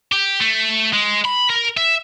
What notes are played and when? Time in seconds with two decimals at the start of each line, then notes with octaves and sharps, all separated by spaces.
0.12 G4
0.40 A3
0.93 G#3
1.25 B5
1.50 A#4
1.77 E5